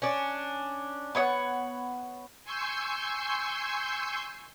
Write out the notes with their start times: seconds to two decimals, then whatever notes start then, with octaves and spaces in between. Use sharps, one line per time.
0.02 C#4 D4
1.15 B3 C#5 D5 F#5
2.44 G#5 C6 C#6 E6 G6 C7